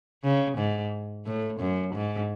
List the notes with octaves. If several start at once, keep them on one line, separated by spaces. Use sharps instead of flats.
C#3
G#2
A2
F#2
G#2